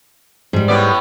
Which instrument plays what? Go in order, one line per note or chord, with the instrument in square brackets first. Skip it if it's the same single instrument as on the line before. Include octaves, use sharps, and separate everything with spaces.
[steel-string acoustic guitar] G#2 G3
[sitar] A2 B3 D5